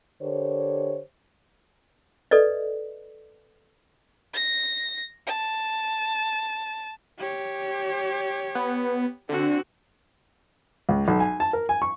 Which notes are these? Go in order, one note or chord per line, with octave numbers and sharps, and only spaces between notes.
D3 G4 A#4 C5 C#5
A4 B4 D5 D#5
A#6
A5
G4 C#5
B3
D3 C4 F#4
C#2
B1
G#5
A5
A#4
G#5
C#6